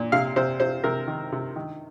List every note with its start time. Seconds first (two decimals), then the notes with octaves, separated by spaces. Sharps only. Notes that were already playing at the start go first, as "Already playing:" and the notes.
Already playing: A#2
0.12 C3 F5
0.36 C3 C5
0.60 C3 C5
0.84 C3 A#4
1.07 D#3
1.32 C3
1.56 D#3